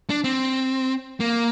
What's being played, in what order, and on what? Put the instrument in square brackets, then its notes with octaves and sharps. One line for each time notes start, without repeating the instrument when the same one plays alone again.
[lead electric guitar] D4
C4
A#3